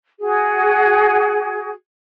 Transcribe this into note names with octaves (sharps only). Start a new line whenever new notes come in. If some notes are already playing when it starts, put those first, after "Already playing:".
F#4 G#4